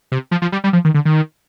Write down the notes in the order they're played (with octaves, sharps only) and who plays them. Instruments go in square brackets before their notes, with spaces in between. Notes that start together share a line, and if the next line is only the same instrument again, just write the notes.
[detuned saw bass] C3
F3
F3
G3
G3
F3
D#3
D3
D#3